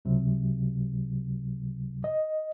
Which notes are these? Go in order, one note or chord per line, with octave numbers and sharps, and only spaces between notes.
C#2 C3 F#3
D#5